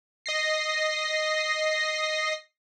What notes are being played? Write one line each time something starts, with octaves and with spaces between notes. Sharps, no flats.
D#5 A#6 C7